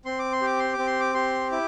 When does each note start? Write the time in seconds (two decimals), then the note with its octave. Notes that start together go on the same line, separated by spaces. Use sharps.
0.05 C4 C6
0.19 D6
0.33 C6
0.42 G4 D6
0.59 C6
0.73 D6
0.78 C4
0.87 C6
1.00 D6
1.14 G4 C6
1.52 E4 D6